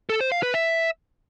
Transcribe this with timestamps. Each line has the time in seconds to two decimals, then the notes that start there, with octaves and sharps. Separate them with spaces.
0.10 A4
0.21 C5
0.32 F5
0.43 B4
0.54 E5